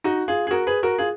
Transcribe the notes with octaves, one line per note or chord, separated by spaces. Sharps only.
D#4 F#4
F4 G#4
G#4
F#4 A#4
G#4 B4
F#4 A#4
F4 G#4